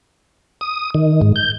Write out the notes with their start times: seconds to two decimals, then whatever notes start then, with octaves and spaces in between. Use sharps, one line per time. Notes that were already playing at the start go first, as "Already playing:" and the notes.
0.61 D#6
0.95 D#3
1.21 G#2
1.36 G6